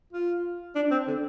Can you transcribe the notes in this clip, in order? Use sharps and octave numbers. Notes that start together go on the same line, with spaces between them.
F4
D4
C4
D3